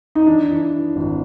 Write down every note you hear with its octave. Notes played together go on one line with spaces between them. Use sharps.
D#4
E3 D4
E3
E3
G#1